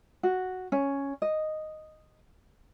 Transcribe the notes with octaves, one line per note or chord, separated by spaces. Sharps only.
F#4
C#4
D#5